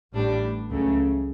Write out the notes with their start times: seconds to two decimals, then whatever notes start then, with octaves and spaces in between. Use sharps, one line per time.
0.13 A1 A2 G3 D4
0.70 C#2 C#3 F#3 A3